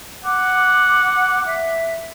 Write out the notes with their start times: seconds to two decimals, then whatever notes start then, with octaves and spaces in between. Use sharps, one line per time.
0.25 F#5 D6
1.46 E5